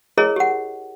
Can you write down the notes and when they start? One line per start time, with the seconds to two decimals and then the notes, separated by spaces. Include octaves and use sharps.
0.18 E4 G#4 A#4 C#5 D#5
0.36 G4 F#5